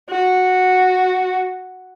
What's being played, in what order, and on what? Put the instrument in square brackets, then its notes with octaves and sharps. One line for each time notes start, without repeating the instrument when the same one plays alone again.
[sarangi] F#4